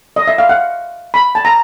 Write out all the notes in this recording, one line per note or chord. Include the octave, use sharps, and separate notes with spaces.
D#5
E5
F5
F#5
B5
A5
A#5